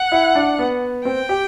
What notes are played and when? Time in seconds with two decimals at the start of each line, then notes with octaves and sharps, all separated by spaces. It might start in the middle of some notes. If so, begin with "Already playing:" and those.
Already playing: F#5
0.12 E4
0.35 D4
0.58 B3
1.05 C4 G5
1.29 G4